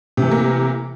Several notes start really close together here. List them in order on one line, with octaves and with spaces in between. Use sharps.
C3 E3 A3 A#3